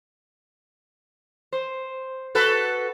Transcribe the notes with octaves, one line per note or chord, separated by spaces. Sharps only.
C5
F#4 A4 B4